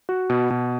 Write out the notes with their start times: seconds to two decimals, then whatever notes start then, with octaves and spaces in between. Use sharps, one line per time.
0.09 F#4
0.30 B2
0.50 B2